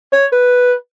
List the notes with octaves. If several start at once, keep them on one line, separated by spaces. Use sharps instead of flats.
C#5
B4